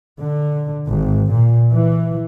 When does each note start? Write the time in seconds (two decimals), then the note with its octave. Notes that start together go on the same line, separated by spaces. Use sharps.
0.21 D3
0.88 G#1
1.33 A#2
1.72 E3